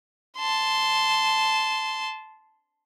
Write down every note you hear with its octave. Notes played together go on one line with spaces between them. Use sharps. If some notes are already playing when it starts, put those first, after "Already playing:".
A5 C6